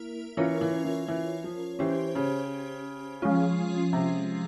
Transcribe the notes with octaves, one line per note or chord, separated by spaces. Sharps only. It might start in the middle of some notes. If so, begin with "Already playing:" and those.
Already playing: A#3 E4 A#4
E3 C#4 F4 A#4 C#5
E3
E3
E3
F3
E3 C#4 G4 C5
C#3
F3 G#3 C#4 F4
C3